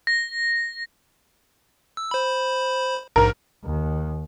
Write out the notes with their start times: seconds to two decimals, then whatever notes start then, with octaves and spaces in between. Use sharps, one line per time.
0.07 A#6
1.97 E6
2.11 C5 B5
3.16 A#1 G#2 A#4
3.64 D#2